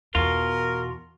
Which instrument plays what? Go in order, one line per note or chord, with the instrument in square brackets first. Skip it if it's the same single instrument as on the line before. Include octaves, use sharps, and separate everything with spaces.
[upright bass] E2 [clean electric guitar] B2 F4 [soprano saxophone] A#4